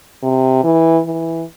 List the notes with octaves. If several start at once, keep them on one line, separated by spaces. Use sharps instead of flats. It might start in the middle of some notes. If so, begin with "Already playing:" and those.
C3
E3
E3